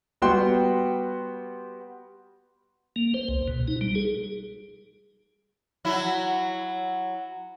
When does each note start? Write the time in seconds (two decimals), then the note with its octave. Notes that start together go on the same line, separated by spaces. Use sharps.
0.22 G3 B3 F#4 G5 C6
2.96 A#3
3.14 C5
3.28 C2
3.48 B2
3.68 D#4
3.81 G3
3.95 G#4
5.85 F#3 E4